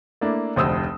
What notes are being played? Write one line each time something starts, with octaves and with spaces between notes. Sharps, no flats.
A3 A#3 D4 E4
F1 D2 C5 D#6 E6